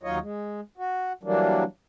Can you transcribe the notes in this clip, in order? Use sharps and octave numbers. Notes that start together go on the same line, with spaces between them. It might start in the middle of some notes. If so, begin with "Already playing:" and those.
D#2 F#3 D#4 F4 C#5 D#5
G#3
F#4
E3 F#3 G3 A#3 D4